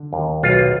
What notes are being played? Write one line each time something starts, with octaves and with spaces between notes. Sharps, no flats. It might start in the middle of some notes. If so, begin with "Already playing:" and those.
Already playing: D3
D#2
B1 F4